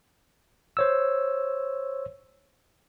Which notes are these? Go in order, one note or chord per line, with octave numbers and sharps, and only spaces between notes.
C5 C#5 E6